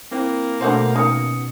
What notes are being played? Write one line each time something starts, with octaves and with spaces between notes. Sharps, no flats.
A#3 C4 E4 C5
B2 D3 A3 F#4 C5 G6 C7
D#3 C#4 D#6 C#7